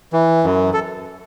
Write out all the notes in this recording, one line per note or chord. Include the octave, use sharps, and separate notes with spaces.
E3
F#2
A4